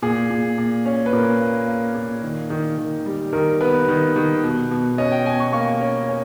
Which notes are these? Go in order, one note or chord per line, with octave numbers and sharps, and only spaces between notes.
A#2 G#4
A#2
A#2
C#4
B4
A#2 A#4
A#3
A#3
A#2
D#3
D#3
D#3
G3
D#3 A#4
B3 B4
D#3
D#3
B2
B2
C#4 D#5
G5
B2 G#5
C#6
A#3 C#6
C#4
C#4